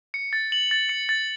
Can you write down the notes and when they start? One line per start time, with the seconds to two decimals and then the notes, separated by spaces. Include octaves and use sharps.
0.14 C#7
0.33 A6
0.52 F#7
0.71 A6
0.89 C#7
1.09 A6